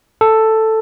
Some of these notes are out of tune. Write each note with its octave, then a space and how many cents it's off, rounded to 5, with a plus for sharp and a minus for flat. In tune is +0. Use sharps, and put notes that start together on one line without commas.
A4 +5